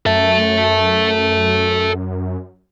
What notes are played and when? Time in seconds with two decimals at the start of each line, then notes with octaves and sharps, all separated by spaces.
0.06 F#2 A4 E5